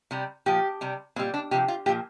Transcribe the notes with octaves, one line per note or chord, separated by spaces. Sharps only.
C3 G3
A#2 F3 G4
C3 G3
A#2 G3 C4
D4
C3 F3 G4
F4
A#2 F3 G4